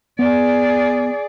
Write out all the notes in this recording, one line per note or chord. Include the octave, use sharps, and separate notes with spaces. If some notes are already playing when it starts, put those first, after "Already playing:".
B3 G#4 D5